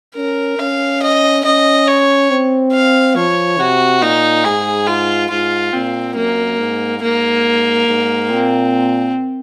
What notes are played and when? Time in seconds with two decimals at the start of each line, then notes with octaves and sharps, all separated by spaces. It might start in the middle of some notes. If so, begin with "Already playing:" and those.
0.16 C#4 A#4
0.59 C#4 F5
1.02 D#5
1.45 C#4 D#5
1.88 C#5
2.30 C4
2.73 F5
3.16 F3 C#5
3.59 C3 F#4
4.01 A#2 D#4
4.45 G#2 G#4
4.87 F4
5.31 G#2 F4
5.73 A#2 C4
6.16 F#2 A#3
6.59 G#2
7.02 G#2 A#3
7.88 G#2
8.30 A#2 C4